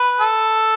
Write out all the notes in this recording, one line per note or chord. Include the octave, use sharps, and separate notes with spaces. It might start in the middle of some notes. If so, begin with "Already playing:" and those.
Already playing: B4
A4